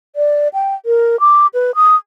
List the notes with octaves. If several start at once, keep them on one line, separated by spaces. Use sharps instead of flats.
D5
G5
A#4
D6
B4
D#6